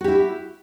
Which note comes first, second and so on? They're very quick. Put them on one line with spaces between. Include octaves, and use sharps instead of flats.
F#4 G4 E4